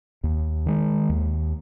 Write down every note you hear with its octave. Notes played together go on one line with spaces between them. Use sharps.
D#2
D#3 G#3
D#2